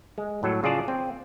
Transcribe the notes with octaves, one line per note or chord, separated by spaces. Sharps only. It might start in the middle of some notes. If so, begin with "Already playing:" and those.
G#3
A2 F#3 A4
C#3 F4 G#4 D5 A5
C4